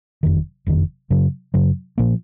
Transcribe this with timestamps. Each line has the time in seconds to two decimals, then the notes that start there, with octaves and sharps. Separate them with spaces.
0.23 F#1 F2 D#3
0.66 F#1 F2 D#3
1.10 F#2 C#3 F#3
1.54 F#2 C#3 F#3
1.98 A#2 F3 A#3